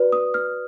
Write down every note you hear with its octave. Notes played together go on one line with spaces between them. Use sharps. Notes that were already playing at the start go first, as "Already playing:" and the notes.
Already playing: F#4 B4 D5
D#6
F6